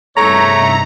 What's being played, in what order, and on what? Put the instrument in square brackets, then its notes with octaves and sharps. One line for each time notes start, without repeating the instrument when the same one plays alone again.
[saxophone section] E2 A3 [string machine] G2 C3 D#4 [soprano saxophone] C#5 [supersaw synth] A#5